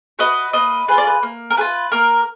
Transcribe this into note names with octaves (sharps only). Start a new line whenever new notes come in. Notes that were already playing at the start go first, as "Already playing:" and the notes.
F#4 B4 D#5
A#3 B4 D#5
F4 G#4 B4
D5
B4
A#3
A#4
F4 G#4 B4
A#3 A#4